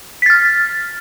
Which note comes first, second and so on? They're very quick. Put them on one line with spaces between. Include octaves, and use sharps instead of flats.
B6 A6 F6